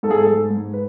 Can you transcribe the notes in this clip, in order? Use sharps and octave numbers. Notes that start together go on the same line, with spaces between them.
G#2 A4
G#4
A4
G#2
G#2
B4